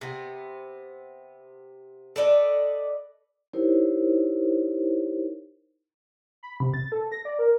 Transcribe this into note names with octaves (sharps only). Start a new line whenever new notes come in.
C3 B3
A4 B4 D5 D#5
D#4 E4 G4 A#4 C5 C#5
B5
C3
A6
A4
A#6
D5
A#4